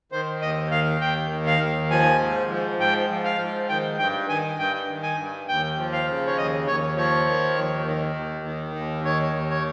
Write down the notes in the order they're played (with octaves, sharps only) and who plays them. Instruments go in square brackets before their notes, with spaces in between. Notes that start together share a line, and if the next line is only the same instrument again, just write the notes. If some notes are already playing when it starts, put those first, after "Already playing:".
[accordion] D#3 C5
D#2 D#5
D#3 F5
D#2 G5
D#3
F5
D#2
F3 G#5
G#2
F3
G#2 G5
F3
F5
G#2
D#3 G5
G2 G5
D#3 G#5
G2 G5
D#3
G#5
G2
D#2 G5
F3
F5
C#3
C#5
D#2 D#5
D#2 C#5
F3 C#5
D#3
D#2
D#3
D#2
D#3
D#2
D#3 C#5
D#2
C#5